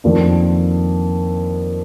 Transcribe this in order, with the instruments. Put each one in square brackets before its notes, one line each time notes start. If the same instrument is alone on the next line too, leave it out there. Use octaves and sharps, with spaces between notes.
[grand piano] F2 D#3 A#3 D4